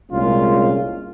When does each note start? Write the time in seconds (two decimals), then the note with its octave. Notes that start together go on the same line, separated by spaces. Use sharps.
0.12 C2 A#2 G#3 C#4 F4